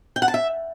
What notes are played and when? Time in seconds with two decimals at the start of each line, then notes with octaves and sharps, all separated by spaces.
0.16 G5
0.22 F#5
0.28 A5
0.34 E5